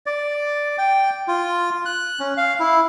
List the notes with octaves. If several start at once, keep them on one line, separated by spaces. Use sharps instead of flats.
D5
G5
F4
F#6
C#4
F5
E4